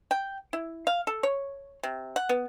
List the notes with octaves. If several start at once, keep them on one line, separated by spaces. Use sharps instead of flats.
G5
E4
F5
A4
C#5
C3
F#5
B3